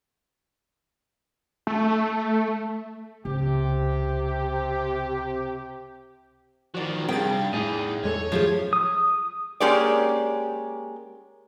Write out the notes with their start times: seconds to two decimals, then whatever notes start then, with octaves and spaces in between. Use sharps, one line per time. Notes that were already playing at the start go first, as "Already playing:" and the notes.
1.67 A3
3.25 C#2 C3 G4
6.74 D#3 F3 F#4 D5
7.09 G2 C3 G#4 G5 A6
7.53 E2 A2 D#4 G#4 D#5
8.03 E2 G#3 A4 C#5
8.32 F#2 D#3 F3 A3 G4 G#4
8.73 D#6
9.60 G#3 A#3 C#4 G4 G#4 D5